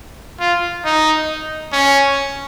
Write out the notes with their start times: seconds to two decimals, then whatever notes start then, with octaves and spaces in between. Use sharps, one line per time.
0.40 F4
0.85 D#4
1.72 C#4